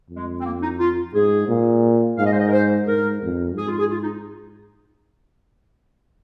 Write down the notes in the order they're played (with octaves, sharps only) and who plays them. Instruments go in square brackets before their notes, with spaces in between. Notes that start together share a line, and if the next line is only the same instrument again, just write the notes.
[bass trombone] F2
[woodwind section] G#3
C4
A#3
D#4
F4
[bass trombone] G#2 [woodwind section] G#4
[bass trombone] A#2
[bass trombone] G#2 [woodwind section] F5
[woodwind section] D#5
C5
D#5
A#4
C5
[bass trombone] G#2 [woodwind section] A#4
[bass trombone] F2
[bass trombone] G#2 [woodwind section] G#4
[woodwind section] F4
G#4
F4
D#4